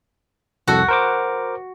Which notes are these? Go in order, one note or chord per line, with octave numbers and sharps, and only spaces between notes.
C2 F2 F#4 A4
A#4 C5 D6